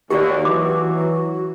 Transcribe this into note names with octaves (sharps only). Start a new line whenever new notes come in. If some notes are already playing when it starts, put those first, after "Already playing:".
D#2 F#4 G4 D5
E3 F#3 D6